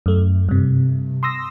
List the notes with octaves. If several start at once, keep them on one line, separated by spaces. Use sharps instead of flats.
F#2 A3
G2 C3
C6 D#6 E6 A#6